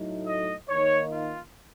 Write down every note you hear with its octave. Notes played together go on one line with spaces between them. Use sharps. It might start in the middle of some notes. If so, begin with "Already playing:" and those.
Already playing: A2 F#3 A3 D#4
D#5
D#3 A#3 D#4 C#5
F4